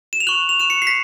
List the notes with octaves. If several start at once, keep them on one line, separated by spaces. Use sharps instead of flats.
E7
F7
C#6 F#6 F#7
F7
C#6 F#6 E7
C#7
C7
B6